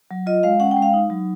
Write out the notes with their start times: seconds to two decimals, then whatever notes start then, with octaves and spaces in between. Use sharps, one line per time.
0.11 F#3
0.26 F4 D#5
0.43 G#3 F5
0.60 C#4 F#5
0.71 G5
0.77 G#3
0.82 F5
0.93 D#4
1.10 F#3